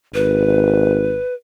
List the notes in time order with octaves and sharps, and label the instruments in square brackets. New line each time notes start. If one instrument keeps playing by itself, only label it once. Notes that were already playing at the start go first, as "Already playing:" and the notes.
[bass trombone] G#1 [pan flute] B4